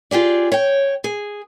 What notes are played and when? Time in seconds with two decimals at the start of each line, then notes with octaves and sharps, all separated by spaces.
0.11 F4 G4 G#4 D5
0.52 C#5 G5
1.04 G#4